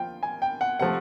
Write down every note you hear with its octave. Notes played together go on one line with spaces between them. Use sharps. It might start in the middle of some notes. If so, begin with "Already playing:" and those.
Already playing: F3 A#3 F4 G5
G#5
G5
F#5
C3 F3 A3 F#5